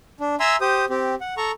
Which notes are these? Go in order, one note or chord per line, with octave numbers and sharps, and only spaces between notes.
D4
E5 G#5 A#5 C6 E6
G4 C5 D#6
C4 G4
F#5
A4 A#5 C#6